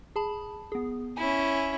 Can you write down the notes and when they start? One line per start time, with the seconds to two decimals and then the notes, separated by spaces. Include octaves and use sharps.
0.16 G#4 A5 B5
0.72 B3 G#4
1.17 C#4 E4 G#5